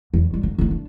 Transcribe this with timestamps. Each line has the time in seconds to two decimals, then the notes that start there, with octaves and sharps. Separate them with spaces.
0.14 E2
0.30 G#2 G3
0.43 D3
0.58 D3 A3
0.71 D4